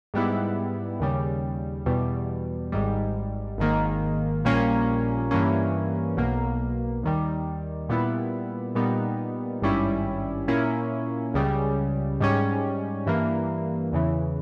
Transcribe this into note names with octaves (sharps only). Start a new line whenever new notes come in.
G#2 G3 B3 E4
D#2 C#3 G3
E2 B2 G3
G#1 G#2 G3
G#1 G#2 D#3 A#3
A#1 A#2 G3 A#3 C#4
G2 E3 A#3 C#4
B1 B2 A#3
D#2 D#3 G3
A#2 G3 B3 E4
A#2 G3 B3 D#4
G#1 G2 G3 C#4 E4
A#2 A#3 C#4 E4
C#2 C#3 G3
G#2 G3 C#4
G2 E3 A#3
E2 C#3 E3